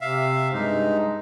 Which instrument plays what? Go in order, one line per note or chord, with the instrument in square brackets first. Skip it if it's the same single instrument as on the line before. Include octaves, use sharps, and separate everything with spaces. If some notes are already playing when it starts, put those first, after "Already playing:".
[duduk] C3 [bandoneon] E5 F5
[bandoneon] G2 D#4 [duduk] G#3